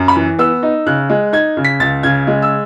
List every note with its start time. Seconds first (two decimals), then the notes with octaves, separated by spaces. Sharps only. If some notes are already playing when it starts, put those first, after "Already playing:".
Already playing: F#2
0.08 B5
0.16 E3
0.38 B3 E6
0.63 D#4
0.86 C#3 F#6
1.09 G#3
1.33 D#4 G#6
1.57 C#3
1.65 B6
1.80 C#2 A6
2.03 C#3 G#6
2.27 G#3
2.42 E6